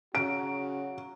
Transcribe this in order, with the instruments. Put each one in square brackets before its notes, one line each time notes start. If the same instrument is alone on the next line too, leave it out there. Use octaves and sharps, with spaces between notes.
[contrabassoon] C#3 [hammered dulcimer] F#3 [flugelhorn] F#4 [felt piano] D7